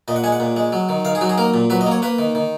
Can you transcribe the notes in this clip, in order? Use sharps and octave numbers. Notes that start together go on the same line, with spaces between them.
A#2 D#5
F#5
G#3 G#5
F#5
A#2
G#3
F#3
D#3
D#3 F5
G#4
F#3 F#4
G#4
A#3 A#4
A#2
F#3 B4
D#5
A#3
C#5
A#3 B4
D#3
D#3